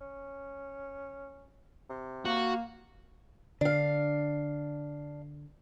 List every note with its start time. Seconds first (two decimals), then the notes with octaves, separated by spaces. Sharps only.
0.01 C#4
1.89 C3
2.25 A#3 F#4
3.61 D3 D4 F5